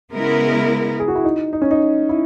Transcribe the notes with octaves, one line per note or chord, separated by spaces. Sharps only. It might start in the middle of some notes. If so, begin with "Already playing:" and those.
C#3 G#3 B3 E4 A#4
G#4
F#4
E4
D#4
D#4
C#4
D#4
E4